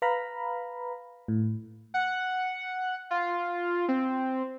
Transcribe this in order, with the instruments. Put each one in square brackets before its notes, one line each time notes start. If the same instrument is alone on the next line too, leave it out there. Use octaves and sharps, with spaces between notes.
[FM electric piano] B4 F5 A#5 B5
A2
[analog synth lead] F#5
F4
C4